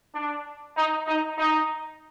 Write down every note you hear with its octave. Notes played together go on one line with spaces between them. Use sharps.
D4
D#4
D#4
D#4